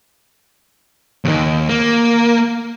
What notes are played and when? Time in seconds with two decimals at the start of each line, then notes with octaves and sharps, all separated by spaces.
1.25 D#2 D#3
1.69 A#3